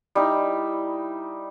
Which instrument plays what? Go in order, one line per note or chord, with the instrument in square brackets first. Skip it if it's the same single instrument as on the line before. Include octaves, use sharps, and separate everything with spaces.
[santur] G3 D#4 E4